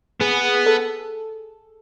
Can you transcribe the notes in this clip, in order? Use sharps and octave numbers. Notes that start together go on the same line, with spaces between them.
B3 G#4
A4